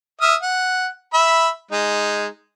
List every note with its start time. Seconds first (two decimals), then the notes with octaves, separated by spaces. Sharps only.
0.21 E5 D#6 F6
0.42 F#5
1.14 E5 B5
1.71 G#3 D#4